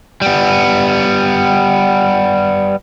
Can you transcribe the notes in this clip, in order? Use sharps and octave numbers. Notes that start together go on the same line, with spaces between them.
G3 B3